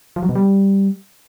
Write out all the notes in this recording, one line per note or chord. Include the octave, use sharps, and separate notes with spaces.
F3
F#3
B2
G3